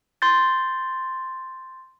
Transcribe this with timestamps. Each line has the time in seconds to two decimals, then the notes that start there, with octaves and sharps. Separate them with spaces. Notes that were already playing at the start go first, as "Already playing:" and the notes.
0.22 C6 G6 A6